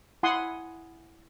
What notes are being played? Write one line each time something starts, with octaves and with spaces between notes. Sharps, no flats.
E4 F#5 G#5 C6 D#6